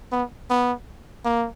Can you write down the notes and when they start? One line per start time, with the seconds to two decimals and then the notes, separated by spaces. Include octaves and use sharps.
0.12 B3
0.50 B3
1.25 A#3